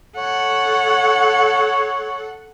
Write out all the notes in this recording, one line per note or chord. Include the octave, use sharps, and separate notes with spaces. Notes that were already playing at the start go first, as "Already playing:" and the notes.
A4 C#5 F#5